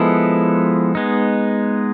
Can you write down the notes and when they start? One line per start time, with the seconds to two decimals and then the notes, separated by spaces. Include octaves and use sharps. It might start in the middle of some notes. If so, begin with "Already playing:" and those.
Already playing: F3 G#3 B3 E4 A4
0.95 G#3 B3 D#4